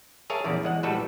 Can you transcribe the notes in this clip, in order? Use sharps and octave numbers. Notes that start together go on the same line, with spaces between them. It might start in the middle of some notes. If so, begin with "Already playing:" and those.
G#4 A#4 C#5 E5 F5 A5
A#1 E2 C#3 D5
E2 G#3 F#5
A#1 A2 G3 F#4 A4 B4